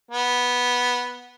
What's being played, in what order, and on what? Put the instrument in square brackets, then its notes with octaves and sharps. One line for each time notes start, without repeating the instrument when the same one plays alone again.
[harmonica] B3